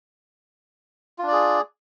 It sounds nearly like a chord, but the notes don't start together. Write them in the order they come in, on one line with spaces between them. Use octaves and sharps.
F4 D4 D5 G#4